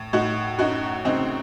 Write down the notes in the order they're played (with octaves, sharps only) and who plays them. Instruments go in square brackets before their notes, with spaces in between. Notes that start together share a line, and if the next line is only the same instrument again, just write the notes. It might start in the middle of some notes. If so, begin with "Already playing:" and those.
Already playing: [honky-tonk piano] A2
A2 D#4 F#4
F#2 D#4 F#4
C#3 C4 D#4